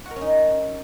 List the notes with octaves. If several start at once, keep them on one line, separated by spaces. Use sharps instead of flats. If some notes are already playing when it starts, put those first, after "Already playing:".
F#4
A#4
C#4
D#4